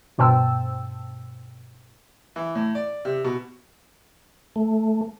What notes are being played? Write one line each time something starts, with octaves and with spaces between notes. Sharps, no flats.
G2 B2 C5 G5 A5 E6
E3
A2
D5
C3
B2
A3